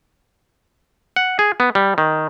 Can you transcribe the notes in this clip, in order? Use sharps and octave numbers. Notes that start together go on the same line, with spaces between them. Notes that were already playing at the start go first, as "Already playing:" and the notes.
F#5
G#4
B3
G3
D#3